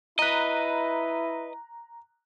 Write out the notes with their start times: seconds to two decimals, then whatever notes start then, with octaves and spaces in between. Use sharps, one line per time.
0.19 E4 B4 D#5 A#5 F#6